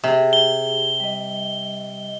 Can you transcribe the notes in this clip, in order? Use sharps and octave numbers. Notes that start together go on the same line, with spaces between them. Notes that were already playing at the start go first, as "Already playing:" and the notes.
C3 G4 G#4
G7
G3 D#5